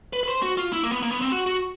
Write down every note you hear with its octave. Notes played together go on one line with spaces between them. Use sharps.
B4
B4
C5
F#4
F4
E4
A#3
B3
A#3
B3
C4
F#4
F#4